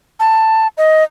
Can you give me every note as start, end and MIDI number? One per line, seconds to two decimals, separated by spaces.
0.20 0.68 81
0.78 1.04 75